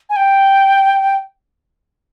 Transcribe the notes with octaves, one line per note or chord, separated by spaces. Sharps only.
G#5
G5